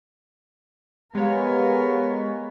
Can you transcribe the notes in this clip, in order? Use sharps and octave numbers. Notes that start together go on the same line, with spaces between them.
G#3 B3 G4 A#4 B4 C#5 F5